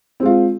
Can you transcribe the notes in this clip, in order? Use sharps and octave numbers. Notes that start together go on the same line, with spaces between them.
G#3 C4 F4